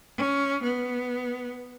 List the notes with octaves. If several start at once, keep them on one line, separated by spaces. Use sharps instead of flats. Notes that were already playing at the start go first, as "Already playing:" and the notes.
C#4
B3